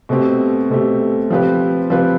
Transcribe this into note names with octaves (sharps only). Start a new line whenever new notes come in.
B2 A3 C4 G4
B2 A3 C4 G4
F3 C4 G4 B4
F3 C4 G4 B4